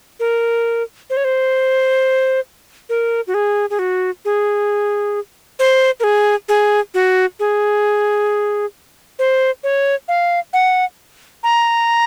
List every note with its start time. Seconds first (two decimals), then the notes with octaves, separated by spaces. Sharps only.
0.20 A#4
1.10 C5
1.17 C#5
1.24 C5
2.89 A#4
3.27 F#4
3.34 G#4
3.70 G#4
3.79 F#4
4.25 G#4
5.59 C5
6.00 A#4
6.04 G#4
6.49 G#4
6.94 F#4
7.40 G#4
9.19 C5
9.64 C#5
10.08 F5
10.53 F#5
11.44 A#5